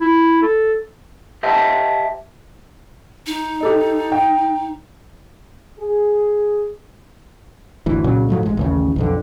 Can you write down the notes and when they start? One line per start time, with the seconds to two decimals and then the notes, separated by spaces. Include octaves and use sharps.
0.01 E4
0.42 A4
1.43 G4 C5 D#5 E5 G5 A5
3.26 D#4
3.61 G4 A4 D#5
4.12 G5
5.80 G#4
7.86 G1 D2 E3
8.04 C2 A#2 C#3 F#3
8.29 G#2 F3 F#3 A3
8.45 A1 G#3
8.57 A1 D#2 C#3
8.96 B1 F2 D3